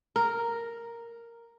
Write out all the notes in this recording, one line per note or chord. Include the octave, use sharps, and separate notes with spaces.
A#4